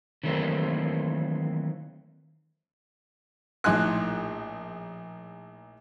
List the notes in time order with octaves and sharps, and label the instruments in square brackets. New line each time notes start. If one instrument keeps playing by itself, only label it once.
[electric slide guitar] D#3 E3 F#3 A3 A#3 C4
[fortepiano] A#1 A2 D#4 G#5 C6 F#6